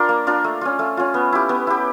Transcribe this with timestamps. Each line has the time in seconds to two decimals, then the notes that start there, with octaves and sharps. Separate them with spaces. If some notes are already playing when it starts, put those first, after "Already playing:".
Already playing: D4 F4 A#4
0.09 A#3
0.27 D4 F4 A#4
0.44 A3
0.61 C#4 F4
0.79 A3
0.97 C#4 F4
1.14 B3
1.33 E4 G4
1.49 B3
1.67 E4 G4